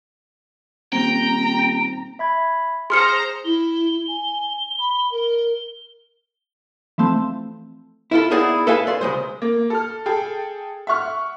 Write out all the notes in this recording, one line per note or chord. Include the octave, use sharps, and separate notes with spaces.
D#1 C4 G5 A#5
E5 B5 G#6
G#4 C5 A#5 C6 F6 C#7
E4 G7
G#5
B5
A#4
E3 F3 A3 C4
E4 F4 A4
B3 D#4 E4 G#4 D5 F#5
A4 B4 E5 F5 G#5
D5 C6
C#2 G#3 C5
A#3
A4 F6
G#4 A4 G5
E5 F#5 C#6 F6